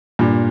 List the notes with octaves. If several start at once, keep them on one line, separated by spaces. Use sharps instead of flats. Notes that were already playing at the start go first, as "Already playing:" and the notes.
G2 A#2